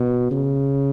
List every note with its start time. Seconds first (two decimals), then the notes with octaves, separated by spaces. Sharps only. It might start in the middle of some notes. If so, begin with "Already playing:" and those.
Already playing: B2
0.31 C#3